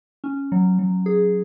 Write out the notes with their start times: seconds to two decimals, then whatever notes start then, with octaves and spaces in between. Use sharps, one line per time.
0.24 C#4
0.52 F#3
0.79 F#3
1.06 G#4